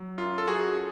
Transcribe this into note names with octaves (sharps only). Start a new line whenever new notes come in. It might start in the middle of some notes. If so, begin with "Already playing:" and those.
Already playing: F#3
F#2 F4
A4
F#2 F#4 G#4